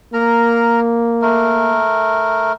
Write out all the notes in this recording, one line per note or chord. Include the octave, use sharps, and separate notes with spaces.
A#3 A#4 A#5
A3 A#4